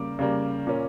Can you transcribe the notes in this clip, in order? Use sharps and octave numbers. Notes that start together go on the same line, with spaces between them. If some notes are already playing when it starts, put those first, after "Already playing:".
Already playing: C#3 G3 A#3 D6
C#3 G3 A#3
A#2 A#3 C#4